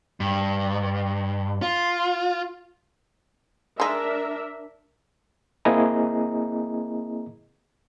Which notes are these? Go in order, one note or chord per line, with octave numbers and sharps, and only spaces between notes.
G2
F4
G#3 D4 D#4 A#4 E5
A#3 C4 E4 G#4 D#5 A#5